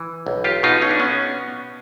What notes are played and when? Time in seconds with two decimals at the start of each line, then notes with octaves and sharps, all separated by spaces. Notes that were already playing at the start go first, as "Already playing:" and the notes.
Already playing: E3
0.27 B1
0.44 F4 G4
0.63 B2 D#4 F4
0.81 C#4 D#4
0.91 D4
1.00 B3 C#4